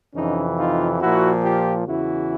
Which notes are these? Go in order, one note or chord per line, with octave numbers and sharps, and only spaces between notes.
F2 C3 E3 C#4 D#4
D#4 F4
A#2 F3 E4 F#4
F4 G4
E2 C#3 E3 E4 F#4